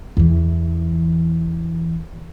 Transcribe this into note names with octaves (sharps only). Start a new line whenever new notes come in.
E2 E3